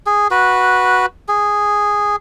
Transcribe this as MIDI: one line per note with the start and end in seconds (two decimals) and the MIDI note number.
0.06 0.28 68
0.31 1.06 66
0.31 1.06 71
1.28 2.16 68